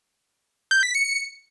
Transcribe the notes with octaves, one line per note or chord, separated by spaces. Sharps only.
G6
B6
C#7